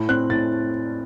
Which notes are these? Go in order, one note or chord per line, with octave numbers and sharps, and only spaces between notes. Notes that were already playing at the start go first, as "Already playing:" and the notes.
Already playing: A2
C4 F#6
A2 A6